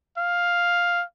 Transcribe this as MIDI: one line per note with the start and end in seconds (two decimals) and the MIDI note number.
0.18 1.03 77